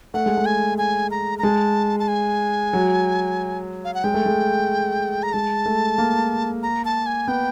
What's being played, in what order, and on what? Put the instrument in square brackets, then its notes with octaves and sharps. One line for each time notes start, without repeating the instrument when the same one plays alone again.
[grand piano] A3 [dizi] F#5
[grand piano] G#3
A3
[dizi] G#5
G#5
A#5
A#5
[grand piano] G#3 [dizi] A5
[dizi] A5
G#5
[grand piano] F#3
[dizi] F5
F#5
[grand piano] G#3 [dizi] G5
[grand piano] A3
G#3
[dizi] A#5
[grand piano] G#3 [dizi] A5
[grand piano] A3
A#3
[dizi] A#5
A5
G#5
[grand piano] B3 [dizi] G5